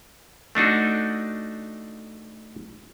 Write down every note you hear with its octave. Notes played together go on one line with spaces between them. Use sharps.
A3 D4 D#4 F#4